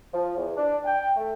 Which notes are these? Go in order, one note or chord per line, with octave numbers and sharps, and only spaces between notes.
F3
E2
D4
G5
A3